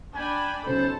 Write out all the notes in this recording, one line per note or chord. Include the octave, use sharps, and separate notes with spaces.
D4 G5 G#5 B5
B1 C#3 C#4 A4 C5 A5